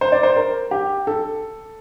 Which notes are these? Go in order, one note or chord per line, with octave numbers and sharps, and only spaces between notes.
C5
D5
C5
A#4
G4
A4